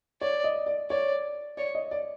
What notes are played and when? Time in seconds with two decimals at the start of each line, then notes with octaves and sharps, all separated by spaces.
0.21 C#5 D5
0.44 D#5
0.66 D5
0.90 C#5 D5
1.57 C#5 D5
1.75 D#5
1.91 D5